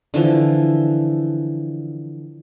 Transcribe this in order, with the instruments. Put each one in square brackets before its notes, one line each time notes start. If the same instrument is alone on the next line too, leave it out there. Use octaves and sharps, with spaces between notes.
[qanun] D3 E3 F3